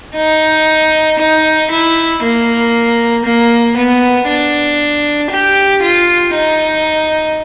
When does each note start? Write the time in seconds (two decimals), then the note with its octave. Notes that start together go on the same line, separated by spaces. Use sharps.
0.16 D#4
1.19 D#4
1.71 E4
2.23 A#3
3.25 A#3
3.77 B3
4.28 D4
5.31 G4
5.82 F4
6.34 D#4